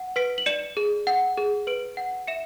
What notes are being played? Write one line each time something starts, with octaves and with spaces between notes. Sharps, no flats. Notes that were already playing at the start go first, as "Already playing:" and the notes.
Already playing: F#5
B4 B6 D7
F#7
D5 C#7 E7
G#4
F#5
G#4
B4 D7 F#7
F#5
E5 C#7 E7